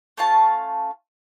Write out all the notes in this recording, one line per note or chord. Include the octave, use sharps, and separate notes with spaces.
A3 C#4 F4 A5